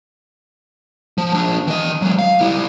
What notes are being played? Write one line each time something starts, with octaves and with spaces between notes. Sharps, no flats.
F3
F3 D4
E3 D#5
F#3 G#3
F5
G3 E4